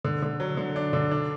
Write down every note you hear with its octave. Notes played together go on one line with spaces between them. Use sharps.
D3
D3
F#3
D3
D4
D3
D4